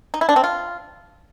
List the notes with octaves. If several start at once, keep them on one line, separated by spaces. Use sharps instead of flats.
D#4
E4
D4
C4
F4